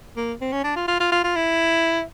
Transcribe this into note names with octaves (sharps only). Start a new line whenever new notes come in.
A#3
C4
C#4
D4
F4
F4
F4
F4
F4
E4